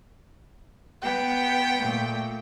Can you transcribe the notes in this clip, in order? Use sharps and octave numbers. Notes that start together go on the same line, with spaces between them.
B3 G5
A#2 A3